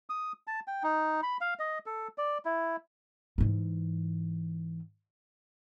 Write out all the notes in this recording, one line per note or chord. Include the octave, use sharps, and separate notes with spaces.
D#6
A5
G5
D#4
B5
F5
D#5
A4
D5
E4
G#2 E3